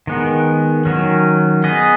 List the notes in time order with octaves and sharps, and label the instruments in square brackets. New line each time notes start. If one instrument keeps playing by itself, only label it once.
[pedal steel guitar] D#3 G#3 B3
D#3 F#3 C#4
B3 G#4 D#5